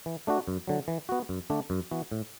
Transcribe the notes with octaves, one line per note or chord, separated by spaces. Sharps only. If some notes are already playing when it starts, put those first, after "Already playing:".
E3
A3 D4 F#4
F#2
D3 F#3
E3
B3 F#4
F#2
D3 A3 D4
F#2
E3 B3 F#4
A2